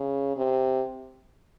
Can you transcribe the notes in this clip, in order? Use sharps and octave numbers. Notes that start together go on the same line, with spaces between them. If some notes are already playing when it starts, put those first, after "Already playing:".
Already playing: C#3
C3